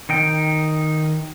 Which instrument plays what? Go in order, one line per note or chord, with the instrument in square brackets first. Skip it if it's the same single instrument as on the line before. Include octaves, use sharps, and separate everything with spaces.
[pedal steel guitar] D#3 D#4 G5